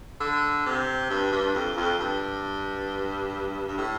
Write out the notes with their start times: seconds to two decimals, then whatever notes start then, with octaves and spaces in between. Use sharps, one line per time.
0.20 D3
0.66 C3
1.10 G2
1.32 G2
1.55 F2
1.77 F2
2.00 G2
3.68 G2
3.78 A2